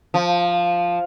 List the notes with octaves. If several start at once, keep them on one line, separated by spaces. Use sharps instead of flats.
F3